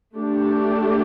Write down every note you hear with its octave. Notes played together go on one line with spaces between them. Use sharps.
A3 D4 G4